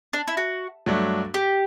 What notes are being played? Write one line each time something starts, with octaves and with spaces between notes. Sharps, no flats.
D4
E4
F#4
G2 F#3 A3 D4
G4